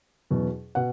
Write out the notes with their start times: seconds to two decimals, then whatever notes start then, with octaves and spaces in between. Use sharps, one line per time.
0.30 E2 B2 F#3
0.75 B2 F#5